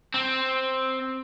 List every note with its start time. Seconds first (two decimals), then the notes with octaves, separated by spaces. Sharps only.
0.14 C4